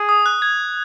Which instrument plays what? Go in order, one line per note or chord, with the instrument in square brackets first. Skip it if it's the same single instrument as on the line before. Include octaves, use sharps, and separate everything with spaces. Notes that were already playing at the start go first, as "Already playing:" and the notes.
Already playing: [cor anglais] G#4
[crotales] D#6
F#6
G#6